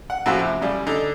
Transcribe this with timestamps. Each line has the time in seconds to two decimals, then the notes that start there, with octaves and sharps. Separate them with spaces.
0.10 F#5
0.26 F2 A2 C#3 F#4
0.39 C3
0.61 A2 C#3 G3
0.87 D3 D#4